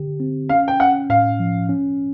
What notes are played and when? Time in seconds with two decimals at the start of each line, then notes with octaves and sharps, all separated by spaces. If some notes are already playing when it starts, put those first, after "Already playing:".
Already playing: D3 G4
0.20 C4
0.49 C#4 F5
0.68 G5
0.80 C#4 F#5
1.10 A2 F5
1.40 F3
1.69 C#4